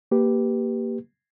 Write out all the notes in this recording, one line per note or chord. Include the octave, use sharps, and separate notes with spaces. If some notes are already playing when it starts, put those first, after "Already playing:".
A#3 G4 B4